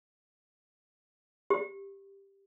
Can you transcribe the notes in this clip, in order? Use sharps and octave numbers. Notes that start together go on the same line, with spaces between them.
G4